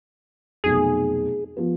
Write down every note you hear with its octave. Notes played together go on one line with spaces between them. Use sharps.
F1 B1 G#4
F3 B3